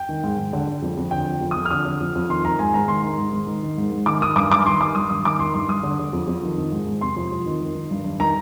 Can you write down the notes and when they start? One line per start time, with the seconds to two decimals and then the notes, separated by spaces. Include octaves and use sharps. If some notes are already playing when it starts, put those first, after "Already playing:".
Already playing: G5
0.09 D#3
0.24 G#2
0.38 G#2
0.53 D3
0.67 D3
0.82 F2
0.97 F2
1.11 D3 G5
1.26 D3
1.41 F2
1.51 D#6
1.56 F2
1.65 F6
1.71 D3 D#6
1.85 D3
2.00 F2
2.15 F2
2.30 D#3 C6
2.45 D#3 A#5
2.59 G#2 G#5
2.74 G#2 A#5
2.88 D#3 C6
3.03 D#3
3.18 G#2
3.33 G#2
3.47 D#3
3.63 D#3
3.78 G#2
3.92 G#2
4.06 D#3 D6
4.21 D#3 D#6
4.36 G2 D6
4.50 G2 D6
4.66 D#3 C6
4.80 D#3 D6
4.95 G2 D#6
5.09 G2 D#6
5.25 D#3 D6
5.39 D#3 C6
5.54 G2 C6
5.69 G2 D#6
5.83 D3
5.99 D3
6.13 F2
6.28 F2
6.43 D#3
6.58 D#3
6.72 G#2
6.87 G#2
7.01 C3 C6
7.16 F2
7.32 F2
7.46 D#3
7.61 D#3
7.75 D#3
7.91 G2
8.05 G2
8.20 D#3 A#5